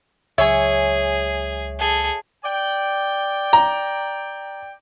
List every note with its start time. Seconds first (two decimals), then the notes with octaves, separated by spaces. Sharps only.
0.38 C#2 F#3 G#4 C#5 E5 G#5
1.79 G#4 A4
2.45 D5 G5
3.53 A#5